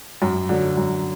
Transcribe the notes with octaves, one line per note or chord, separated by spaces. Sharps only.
F#2
D3 F#3
F#2